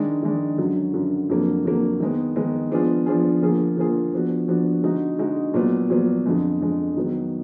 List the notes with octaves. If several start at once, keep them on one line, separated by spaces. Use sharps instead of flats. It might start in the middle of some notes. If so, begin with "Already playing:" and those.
Already playing: D#3 G#3 D4
D#3 G#3 D4
F#2 D3 F#3
F#2 D3 F#3
F2 D3 F#3 A#3
F2 D3 F#3 A#3
D#3 G#3 B3
D#3 G#3 B3
F3 B3 D4 F4 G#4
F3 B3 D4 F4 G#4
D3 F3 A#3 F4 G#4
D3 F3 A#3 F4 G#4
F3 B3 D4 F#4
F3 B3 D4 F#4
D3 G#3 D#4 F#4
D3 G#3 D#4 F#4
A#2 F#3 B3
A#2 F#3 B3
F2 D3 G#3
F2 D3 G#3
D#3 F#3 B3